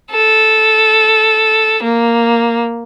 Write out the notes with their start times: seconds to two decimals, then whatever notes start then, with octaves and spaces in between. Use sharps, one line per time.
0.11 A4
1.84 A#3